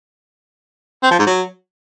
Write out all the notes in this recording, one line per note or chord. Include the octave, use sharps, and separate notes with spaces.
C4
F3
G#2
F#3